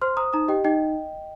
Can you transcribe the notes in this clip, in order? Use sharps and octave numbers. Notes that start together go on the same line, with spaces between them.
C5 C6 F6
C5 A#5 D#6
D#4 A#5 D#6
G4 D#5 G5
D#4 D#5 G5